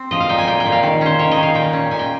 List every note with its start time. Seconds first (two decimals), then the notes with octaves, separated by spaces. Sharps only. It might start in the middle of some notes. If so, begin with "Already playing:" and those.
Already playing: C4
0.11 F3 D#5
0.20 F5
0.29 A#2 G5
0.38 G#5
0.47 A#2 G5
0.60 G5
0.66 A#2
0.72 F5
0.83 D#3
1.01 C#4 C5
1.19 D#3 C#5
1.31 D#5
1.37 D#3
1.43 F5
1.55 A#2 G5
1.73 C#4
1.91 A#2 G#5
1.99 G5